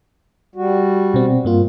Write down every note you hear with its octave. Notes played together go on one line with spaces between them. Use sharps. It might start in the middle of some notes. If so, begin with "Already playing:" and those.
G3 F#4
B2 C4
G2 A#3 F4